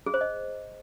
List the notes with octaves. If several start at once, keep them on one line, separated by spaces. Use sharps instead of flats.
G#4
C5
D#5